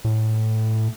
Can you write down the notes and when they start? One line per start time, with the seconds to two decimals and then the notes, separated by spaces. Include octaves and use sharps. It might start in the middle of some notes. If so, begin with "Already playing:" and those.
0.05 A2